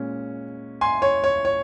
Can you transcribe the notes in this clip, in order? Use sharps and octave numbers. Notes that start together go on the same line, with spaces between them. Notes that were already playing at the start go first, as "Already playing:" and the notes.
Already playing: A#2 G#3 C#4
G#5 C6
C#5
C#5
C#5